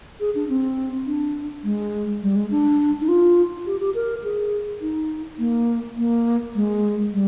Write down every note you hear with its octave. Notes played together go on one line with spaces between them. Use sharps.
G#4
D4
C4
D4
G#3
G3
G#3
D4
D#4
F4
G4
G4
A#4
G#4
D#4
A#3
A#3
G#3
G3